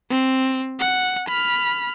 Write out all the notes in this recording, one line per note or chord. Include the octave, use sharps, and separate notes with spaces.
C4
F#5
B5 F6